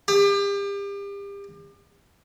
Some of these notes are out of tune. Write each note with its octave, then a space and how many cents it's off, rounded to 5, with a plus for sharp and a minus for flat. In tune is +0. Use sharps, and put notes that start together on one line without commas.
G4 +35